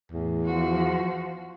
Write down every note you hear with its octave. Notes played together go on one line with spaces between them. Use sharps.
E2 A2
F3 F#4